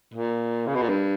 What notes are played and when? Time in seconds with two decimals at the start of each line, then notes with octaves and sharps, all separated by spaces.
0.14 A#2
0.67 C#3
0.75 B2
0.82 A#2
0.89 G2